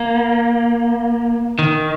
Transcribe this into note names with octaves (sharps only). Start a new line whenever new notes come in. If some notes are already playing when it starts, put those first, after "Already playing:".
Already playing: A#3
D#3